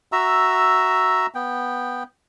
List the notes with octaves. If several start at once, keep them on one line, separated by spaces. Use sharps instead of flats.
F#4 E5 A#5 E6
B3 G5